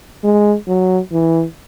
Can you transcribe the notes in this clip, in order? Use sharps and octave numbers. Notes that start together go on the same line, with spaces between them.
G#3
F#3
E3